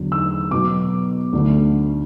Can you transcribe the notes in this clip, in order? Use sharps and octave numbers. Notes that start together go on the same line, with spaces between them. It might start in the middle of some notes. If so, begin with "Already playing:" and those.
Already playing: E2 D3 F#3
E6
B2 F#3 B3 D6
D2 D3 A3